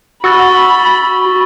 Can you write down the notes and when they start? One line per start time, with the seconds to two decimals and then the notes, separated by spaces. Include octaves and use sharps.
0.24 F#4 B5 C#6 E6 A6